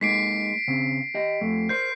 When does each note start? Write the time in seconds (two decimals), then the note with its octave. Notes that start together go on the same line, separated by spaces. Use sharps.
0.01 G#3 A#3 D#4 B6 C7 D7
0.68 C#3 C4
1.14 G4 D#5
1.41 F2 A3
1.69 A#4 C5 G6 C7